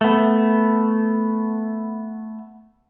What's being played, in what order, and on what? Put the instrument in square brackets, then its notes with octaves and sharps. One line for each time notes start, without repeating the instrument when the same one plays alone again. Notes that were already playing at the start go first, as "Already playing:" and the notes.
[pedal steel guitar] A3 B3